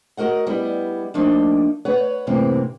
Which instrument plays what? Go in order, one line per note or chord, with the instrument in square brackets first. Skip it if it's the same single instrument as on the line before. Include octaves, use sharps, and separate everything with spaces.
[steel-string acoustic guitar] F#4 A#4 D#5 F#5
G3 B3 E4 D#5
F3 A3 A#3 D4 D#4
B4 C#5 F#5
F#2 A2 C3 E3 A#3 C4